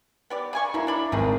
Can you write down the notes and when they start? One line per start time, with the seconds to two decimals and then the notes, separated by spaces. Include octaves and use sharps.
0.30 B3 G4 D5
0.53 C#3 G#5 C#6
0.74 D3 A#3 E4
0.87 D4 D5 B5
1.12 G#1 D3 C4 G#4